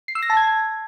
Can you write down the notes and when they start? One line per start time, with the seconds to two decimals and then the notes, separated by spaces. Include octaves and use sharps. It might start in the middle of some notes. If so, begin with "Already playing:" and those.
0.08 C7
0.15 E6
0.23 A#6
0.30 A5
0.37 G#6